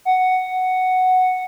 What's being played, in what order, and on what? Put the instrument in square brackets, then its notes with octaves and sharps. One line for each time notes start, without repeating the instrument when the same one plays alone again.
[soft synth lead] F#5